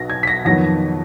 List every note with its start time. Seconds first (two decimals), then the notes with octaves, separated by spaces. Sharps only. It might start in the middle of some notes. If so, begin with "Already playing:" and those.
Already playing: B1 B2 A#6
0.10 G#6
0.23 B6
0.27 A#6
0.45 F2 D#3 F#3 B3 A#6